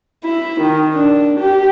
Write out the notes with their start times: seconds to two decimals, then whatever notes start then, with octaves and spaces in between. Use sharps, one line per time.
0.24 E4
0.61 D#3
0.95 D4
1.40 G4